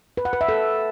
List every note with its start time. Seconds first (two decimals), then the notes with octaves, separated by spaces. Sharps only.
0.17 B4
0.25 F#5
0.33 B4
0.41 E5
0.49 A4